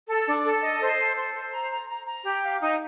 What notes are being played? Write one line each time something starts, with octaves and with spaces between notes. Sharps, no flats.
A4
D4
A4
D#5
C5
A4
C5
C5
A#5
A#5
A#5
A#5
G4
F5
D#4